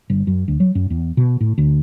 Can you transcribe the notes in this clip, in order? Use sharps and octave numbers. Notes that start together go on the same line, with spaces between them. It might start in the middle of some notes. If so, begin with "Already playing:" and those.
G1
F#2
D2
F#3
F#2
E2
B2
A2
D2